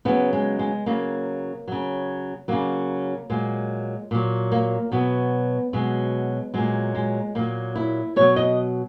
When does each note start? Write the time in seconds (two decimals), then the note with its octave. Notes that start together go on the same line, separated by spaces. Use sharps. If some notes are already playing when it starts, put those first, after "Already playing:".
0.05 C#3 F#3 B3
0.33 G#3
0.59 G#3
0.86 C#3 F#3 A#3
1.68 C#3 F#3
2.48 C#3 F#3 A#3
3.30 A#2 F#3 G#3
4.11 A#2 F#3
4.52 A#3
4.92 B2 F#3 B3
5.73 B2 F#3 G#3
6.54 A#2 F#3 G#3
6.95 G#3
7.35 A#2 F#3 A#3
7.76 E4
8.16 B2 F#3 C#5
8.36 D#5